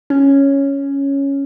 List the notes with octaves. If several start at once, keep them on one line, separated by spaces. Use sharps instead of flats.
C#4